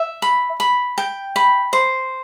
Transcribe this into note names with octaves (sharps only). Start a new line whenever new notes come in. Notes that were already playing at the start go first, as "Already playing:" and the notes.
Already playing: E5
B5
B5
G5
B5
C5